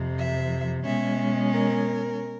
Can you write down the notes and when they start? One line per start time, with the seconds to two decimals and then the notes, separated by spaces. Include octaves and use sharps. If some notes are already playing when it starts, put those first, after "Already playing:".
Already playing: F2 C3 F3
0.17 E5
0.84 B2 G#3 C#4 E5
1.51 A#4